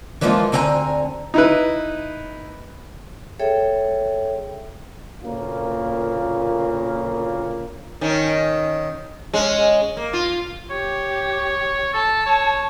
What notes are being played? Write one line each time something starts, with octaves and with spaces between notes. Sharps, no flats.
E3 F3 G#3 A#3 B3 F4
D2 D3 C4 G#5 A#5
D#4 E4 B4
G#4 A4 C#5 E5 G5
D2 A#2 C#3 A#3 F4
D#3 C#4
G#3 C#4
A#3
F4
G4 C#5
A4 A5
C#5